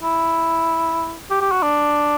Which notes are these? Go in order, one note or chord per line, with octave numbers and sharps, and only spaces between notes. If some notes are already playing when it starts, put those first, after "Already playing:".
E4
G4
G4
F#4
D4